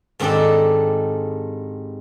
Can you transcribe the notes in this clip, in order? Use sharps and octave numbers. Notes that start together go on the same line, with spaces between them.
G#2 D#3 C4 D4 G4 A4